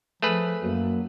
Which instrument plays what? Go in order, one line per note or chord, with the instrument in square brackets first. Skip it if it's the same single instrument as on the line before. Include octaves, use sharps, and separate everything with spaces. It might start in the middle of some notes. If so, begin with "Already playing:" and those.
[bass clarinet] F3 [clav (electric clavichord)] A3 G#4 B4
[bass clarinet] F#2 [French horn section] F#3 A#3